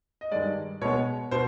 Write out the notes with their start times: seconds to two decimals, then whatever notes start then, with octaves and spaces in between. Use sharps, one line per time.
0.21 D#5
0.31 G2 D#3 G#3 D5
0.81 B2 G#3 B3 C#5
1.31 B2 C5